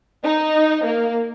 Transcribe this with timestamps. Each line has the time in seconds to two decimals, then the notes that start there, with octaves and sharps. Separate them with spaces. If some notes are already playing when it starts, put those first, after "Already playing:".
0.24 D#4
0.84 A#3